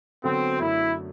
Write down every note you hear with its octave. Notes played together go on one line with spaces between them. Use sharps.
D3 F#3 B3 C4 F#4 A4
F#2 D3 F#3 A3 E4